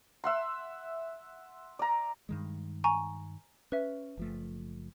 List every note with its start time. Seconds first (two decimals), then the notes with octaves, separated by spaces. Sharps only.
0.24 E5 F#5 C6
1.79 D5 A#5
2.29 G2 D#3 G#3
2.84 G#5 A#5 C#6
3.72 C#4 B4 E5
4.17 F#1 F3 A3